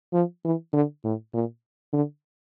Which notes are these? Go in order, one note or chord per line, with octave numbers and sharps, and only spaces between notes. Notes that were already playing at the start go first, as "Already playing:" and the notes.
F3
E3
D3
A2
A#2
D3